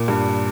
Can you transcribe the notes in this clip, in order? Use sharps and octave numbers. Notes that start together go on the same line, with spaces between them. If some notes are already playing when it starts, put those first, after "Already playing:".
Already playing: A#2
G2